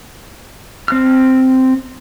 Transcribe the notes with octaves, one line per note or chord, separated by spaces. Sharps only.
C4 F6